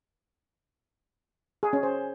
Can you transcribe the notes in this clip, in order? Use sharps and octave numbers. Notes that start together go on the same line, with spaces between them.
G#4
C#4
C5